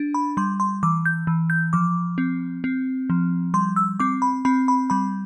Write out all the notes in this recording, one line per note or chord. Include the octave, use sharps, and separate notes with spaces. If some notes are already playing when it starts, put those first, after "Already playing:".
Already playing: D4
B5
G3 C6
C6
E3 D6
G6
E3
G6
F3 D6
C4
C4
F3
G3 C6
E6
C4 D6
B5
C4 B5
B5
G3 B5